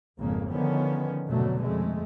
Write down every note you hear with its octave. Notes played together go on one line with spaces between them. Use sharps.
G#1 F2 C#3 A#3
D3 D#3 F3 B3 C#4
F1 G#2 B2 D3 F#3 A3
F2 G#3 A3